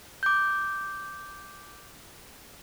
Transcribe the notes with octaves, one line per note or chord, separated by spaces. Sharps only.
D6 G6